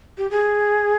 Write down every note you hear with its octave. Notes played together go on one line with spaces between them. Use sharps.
G4
G#4